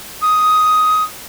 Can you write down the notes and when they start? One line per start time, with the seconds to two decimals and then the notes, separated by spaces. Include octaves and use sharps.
0.22 D#6